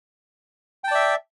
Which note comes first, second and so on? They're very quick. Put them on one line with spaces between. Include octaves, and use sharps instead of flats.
G5 A5 D5 E5